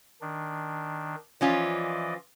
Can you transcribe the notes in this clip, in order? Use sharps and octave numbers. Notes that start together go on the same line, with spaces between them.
D#3 D4
E3 F3 C#4 F4 D5 D#5